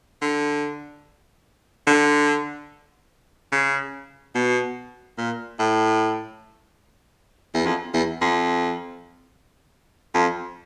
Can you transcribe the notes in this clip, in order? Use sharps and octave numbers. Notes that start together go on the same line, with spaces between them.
D3
D3
C#3
B2
A#2
A2
E2
F2
E2
F2
F2